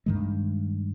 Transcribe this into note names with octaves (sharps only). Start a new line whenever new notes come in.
G2 D#3 G#3